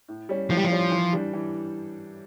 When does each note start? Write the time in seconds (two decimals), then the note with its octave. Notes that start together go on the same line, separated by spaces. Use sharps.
0.08 A2
0.29 G3 C#4
0.49 A2 F3
0.57 G3
0.64 F3
0.71 G3 C#4
0.91 E3
1.13 G3 D4
1.33 E3